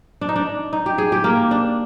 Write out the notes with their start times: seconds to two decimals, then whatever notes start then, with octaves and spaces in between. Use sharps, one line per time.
0.21 D4
0.29 D#4
0.36 D4
0.73 D#4
0.86 G4
0.98 G#4
1.12 G4
1.24 A#3
1.51 D4